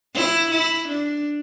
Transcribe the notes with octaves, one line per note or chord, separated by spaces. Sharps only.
E4
E4
D4